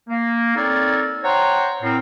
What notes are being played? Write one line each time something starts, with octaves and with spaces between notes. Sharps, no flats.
A#3
C4 D#4 A4 A#4 C#5 D5
C5 C#5 F#5 G5 A#5 C6
A2 C4 A#4